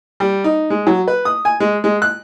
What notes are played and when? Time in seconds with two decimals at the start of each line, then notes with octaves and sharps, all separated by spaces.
0.20 G3
0.44 D#4
0.70 G#3
0.87 F#3
1.08 B4
1.25 D#6
1.45 G#5
1.60 G#3
1.84 G#3
2.02 F#6